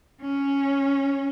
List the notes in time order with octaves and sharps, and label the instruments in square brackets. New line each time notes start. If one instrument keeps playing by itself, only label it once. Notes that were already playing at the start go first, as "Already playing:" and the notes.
[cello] C#4